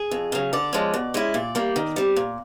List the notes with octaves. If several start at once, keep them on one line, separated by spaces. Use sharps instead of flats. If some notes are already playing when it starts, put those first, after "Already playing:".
Already playing: G#4
F2
C#3 F#3
D3 D5
F3 G#3 C#4
B2
G#3 C#4 E4
A#2 D5
G3 A#3
D#3
G3 C4
A#2